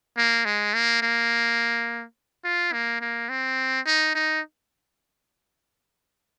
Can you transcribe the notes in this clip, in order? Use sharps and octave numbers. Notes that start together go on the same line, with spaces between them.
A#3
G#3
A#3
A#3
F4
A#3
A#3
C4
D#4
D#4